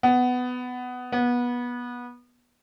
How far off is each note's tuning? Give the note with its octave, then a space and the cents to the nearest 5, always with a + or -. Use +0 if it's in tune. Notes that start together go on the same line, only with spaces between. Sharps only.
B3 +15
B3 -20